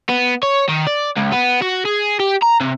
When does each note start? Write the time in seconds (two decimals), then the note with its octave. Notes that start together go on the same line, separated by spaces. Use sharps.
0.09 B3
0.43 C#5
0.69 D#3
0.87 D5
1.17 C#2
1.32 B3
1.62 F#4
1.85 G#4
2.20 G4
2.42 A#5
2.61 C3